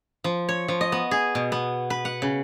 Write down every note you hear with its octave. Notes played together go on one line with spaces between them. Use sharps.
F3
C#5
F3
D#5
B3
G#4
B2
B3
B4
F#5
C#3